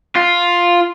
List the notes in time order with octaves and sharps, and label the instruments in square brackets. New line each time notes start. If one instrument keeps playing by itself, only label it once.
[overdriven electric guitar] F4